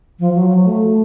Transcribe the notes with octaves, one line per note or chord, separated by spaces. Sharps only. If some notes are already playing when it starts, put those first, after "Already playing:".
F3
F#3
F#3
A3